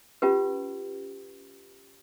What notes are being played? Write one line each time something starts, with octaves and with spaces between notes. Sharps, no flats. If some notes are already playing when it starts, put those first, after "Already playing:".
C#4 F4 G4 B4